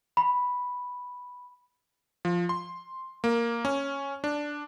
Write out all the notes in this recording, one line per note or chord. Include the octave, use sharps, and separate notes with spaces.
B5
F3
C6
A#3
C#4
D4